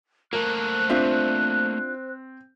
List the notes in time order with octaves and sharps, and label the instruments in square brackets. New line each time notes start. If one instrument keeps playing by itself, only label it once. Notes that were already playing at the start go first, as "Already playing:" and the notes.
[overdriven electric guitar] A3 A#3 [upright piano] A#4 [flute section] C5 F#6
[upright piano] C4 [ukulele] D4 F4 E5